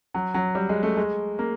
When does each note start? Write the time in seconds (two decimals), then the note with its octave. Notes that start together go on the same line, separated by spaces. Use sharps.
0.14 F#3
0.34 F#3
0.55 G3
0.69 G#3
0.83 A3
0.97 G#3
1.39 A#3